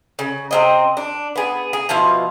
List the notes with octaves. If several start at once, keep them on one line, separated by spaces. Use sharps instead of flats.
C#3
C3 C4 D#5
D4
B3 G#4
G#4
B2 F3 E4 F5